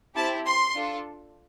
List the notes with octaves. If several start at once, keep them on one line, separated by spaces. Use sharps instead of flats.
C4 E4 G4 A5
C6
D4 F4 A4